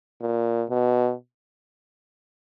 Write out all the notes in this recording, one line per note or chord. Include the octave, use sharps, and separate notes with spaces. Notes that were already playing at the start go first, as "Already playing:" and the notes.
A#2
B2